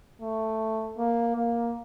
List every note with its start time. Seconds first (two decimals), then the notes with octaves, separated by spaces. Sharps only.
0.20 A3
0.98 A#3
1.36 A#3